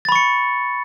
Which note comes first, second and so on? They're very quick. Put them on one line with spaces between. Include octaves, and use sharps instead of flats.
A6 B5 C#6 C#7